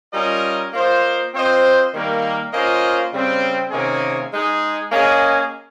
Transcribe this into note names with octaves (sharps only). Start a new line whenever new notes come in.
G3 C#4 F4 A#4 D#5
A#3 F4 C5 D#5
C4 F4 C5 D#5
D#3 G3 A#3
A#3 C#4 F4 C5 D#5
C#3 G3 C4
C3 D#3 A#3 C#4 G#4
G#3 D#4 G#4
A#3 C#4 G#4 D#5